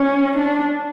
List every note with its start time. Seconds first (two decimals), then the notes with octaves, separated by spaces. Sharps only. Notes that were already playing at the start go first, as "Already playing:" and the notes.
Already playing: C#4
0.37 D4